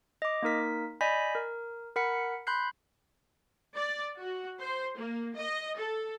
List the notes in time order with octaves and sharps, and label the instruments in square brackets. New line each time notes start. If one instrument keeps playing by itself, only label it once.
[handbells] D#5 D6
A#3 D#4 A#4 B6
D5 D#5 G#5 B5 G6 B6
A#4
A#4 F#5 B5 B6 C#7
B5 C6 F#6 G6 C7
[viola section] D5
F#4
C5
A#3
D#5
A4